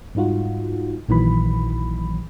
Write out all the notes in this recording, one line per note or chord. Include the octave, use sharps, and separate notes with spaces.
G#2 G3 D#4 F4 F#4
A#1 A#2 D#3 E3 F#3 B5